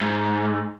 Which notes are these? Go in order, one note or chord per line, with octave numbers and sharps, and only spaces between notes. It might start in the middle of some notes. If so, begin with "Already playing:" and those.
G#2